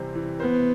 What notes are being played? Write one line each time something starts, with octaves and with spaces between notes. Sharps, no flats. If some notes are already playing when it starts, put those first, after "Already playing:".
Already playing: C3 E3 G3 C4
E3
B3 C5